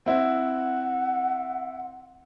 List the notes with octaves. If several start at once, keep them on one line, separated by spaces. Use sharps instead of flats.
C4 E4 F#5